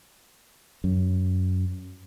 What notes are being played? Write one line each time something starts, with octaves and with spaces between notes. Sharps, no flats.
F#2